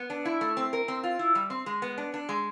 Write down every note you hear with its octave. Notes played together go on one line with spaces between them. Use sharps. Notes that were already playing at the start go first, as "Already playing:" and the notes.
Already playing: B3
D4
E4
A3
C4
A#4
C4
F4
E4
G3
C4
G#3
B3
D4
D4
G#3